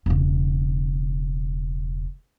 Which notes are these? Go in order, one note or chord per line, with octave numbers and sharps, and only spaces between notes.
E1 C#3